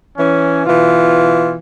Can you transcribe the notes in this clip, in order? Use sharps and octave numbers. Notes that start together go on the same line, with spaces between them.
E3 C#4
B2 E3 F4